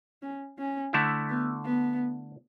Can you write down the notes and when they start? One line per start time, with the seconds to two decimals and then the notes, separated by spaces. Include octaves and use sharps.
0.22 C#4
0.59 C#4
0.93 D3 A3 E4
1.29 B3
1.65 B3